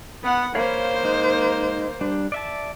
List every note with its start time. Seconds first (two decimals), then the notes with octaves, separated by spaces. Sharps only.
0.23 B3 F#5
0.55 A#3 C5 C#5 F5 B5
1.04 G#3 D#4
2.01 G3 D4
2.32 D5 E5 A5